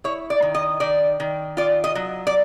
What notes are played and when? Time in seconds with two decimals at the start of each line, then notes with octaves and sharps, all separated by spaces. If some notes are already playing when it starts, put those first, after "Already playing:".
0.04 E4 C#5
0.30 D5
0.42 D#3
0.55 D#5
0.80 D#3 D5
1.20 D#3
1.57 F4 D5
1.84 D#5
1.95 F#3
2.27 D5